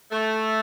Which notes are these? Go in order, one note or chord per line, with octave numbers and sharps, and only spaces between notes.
A3